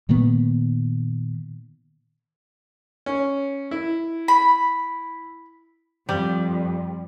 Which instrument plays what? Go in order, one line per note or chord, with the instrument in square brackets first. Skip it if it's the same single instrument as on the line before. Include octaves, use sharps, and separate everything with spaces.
[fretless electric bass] A#2 D#3 A#3 B3
[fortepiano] C#4
E4
[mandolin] B5
[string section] F2 [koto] G3